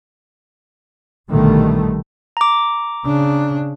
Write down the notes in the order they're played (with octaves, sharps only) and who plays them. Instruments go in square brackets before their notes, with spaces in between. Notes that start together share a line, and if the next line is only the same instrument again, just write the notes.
[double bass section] A#1 B2 D3 D#3 G3 A3
[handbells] A#5 D6
[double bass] C#3 D4